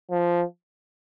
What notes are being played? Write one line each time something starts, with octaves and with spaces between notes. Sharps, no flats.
F3